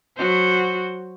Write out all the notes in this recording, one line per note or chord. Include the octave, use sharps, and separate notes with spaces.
F#3 F#4 C5